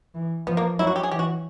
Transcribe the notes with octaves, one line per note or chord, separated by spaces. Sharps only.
E3
F3 B3
A#3
F#3 E4
F#4
G4
G#4
E3 G4
F#4